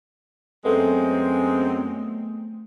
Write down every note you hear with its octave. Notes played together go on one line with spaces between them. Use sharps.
F#2 G#3 A3 B3 C4